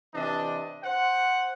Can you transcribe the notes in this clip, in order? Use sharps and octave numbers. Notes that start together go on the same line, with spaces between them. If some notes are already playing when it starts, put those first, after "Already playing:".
C3 E3 D4 D#5
C5 F#5